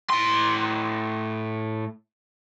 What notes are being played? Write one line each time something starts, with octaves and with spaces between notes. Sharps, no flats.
A2 C6